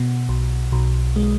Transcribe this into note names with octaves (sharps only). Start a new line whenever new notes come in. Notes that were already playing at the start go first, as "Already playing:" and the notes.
Already playing: B2
B1
B1
G#3